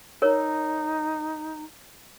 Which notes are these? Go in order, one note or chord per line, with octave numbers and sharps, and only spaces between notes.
D#4 A#4 C#5